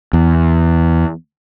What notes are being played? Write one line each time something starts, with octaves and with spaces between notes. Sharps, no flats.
E2